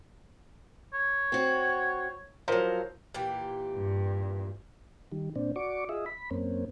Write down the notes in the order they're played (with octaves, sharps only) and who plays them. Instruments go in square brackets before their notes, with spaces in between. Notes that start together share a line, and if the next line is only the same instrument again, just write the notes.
[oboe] C#5
[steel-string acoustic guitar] C4 F#4
[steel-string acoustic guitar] F3 F#3 [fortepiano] A#4 C5
[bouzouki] A#2 E3 G4
[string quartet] G2
[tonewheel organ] D#3 G3
A#2 C4 D4
F#4 D5 C#6 D6
F4 G#4 D#5 E5
B5
F#2 A#3 C4 C#4